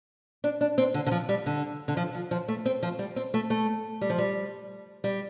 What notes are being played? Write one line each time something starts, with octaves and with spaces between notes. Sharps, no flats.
D4
D4
C4
D3
D3
F3
G3
D3
D3
F3
F3
F3
A3
C4
F3
G3
C4
A3
A3
G3
F3
G3
G3